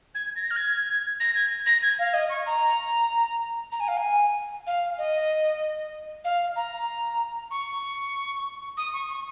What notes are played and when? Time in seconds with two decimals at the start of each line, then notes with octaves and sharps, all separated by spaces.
0.15 G#6
0.36 A#6
0.50 F6
0.56 G#6
1.20 A#6
1.35 G#6
1.66 A#6
1.82 G#6
1.99 F5
2.14 D#5
2.30 C#6
2.46 A#5
3.72 A#5
3.80 G#5
3.88 F5
3.97 G#5
4.67 F5
4.98 D#5
6.25 F5
6.56 A#5
7.51 C#6
8.77 D#6
8.93 C#6
9.09 C#6